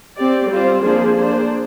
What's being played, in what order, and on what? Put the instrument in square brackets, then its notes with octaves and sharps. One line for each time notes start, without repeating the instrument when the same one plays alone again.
[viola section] C4 G4 D5
G3 C4 F4 C5
F3 A#3 D4 G#4 C5
A#3 D4 G#4 C5